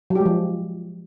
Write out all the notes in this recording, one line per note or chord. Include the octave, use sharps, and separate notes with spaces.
F#3
G4
G#3
F3